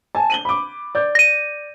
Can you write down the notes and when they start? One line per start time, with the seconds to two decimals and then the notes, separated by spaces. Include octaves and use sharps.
0.15 G#5 A5
0.30 D#7 F#7 G7
0.45 B5 D6
0.95 D5 G6
1.15 A#6 D#7